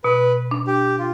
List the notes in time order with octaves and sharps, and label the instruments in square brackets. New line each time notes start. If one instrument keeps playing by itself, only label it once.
[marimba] B2 [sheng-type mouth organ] B4
[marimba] D4
[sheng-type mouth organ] G4
F4